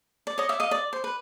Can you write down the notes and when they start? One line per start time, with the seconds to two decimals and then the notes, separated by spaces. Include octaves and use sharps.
0.27 D5
0.38 C#5 D#5
0.49 D5 E5
0.60 D#5 F5
0.71 D5
0.93 C5
1.04 B4